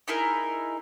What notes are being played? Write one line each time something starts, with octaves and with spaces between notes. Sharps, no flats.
D#4 E4 G#4 A#4